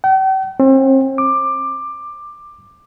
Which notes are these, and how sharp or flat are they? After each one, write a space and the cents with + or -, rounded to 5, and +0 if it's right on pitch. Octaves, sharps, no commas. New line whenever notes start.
G5 -45
C4 +40
D6 +15